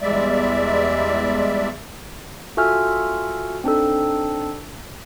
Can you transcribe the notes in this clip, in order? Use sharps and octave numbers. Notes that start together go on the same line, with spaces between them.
E2 G3 G#3 D5 E5
F4 F#4 A4 E5 G#5 F6
C4 D4 D#4 A4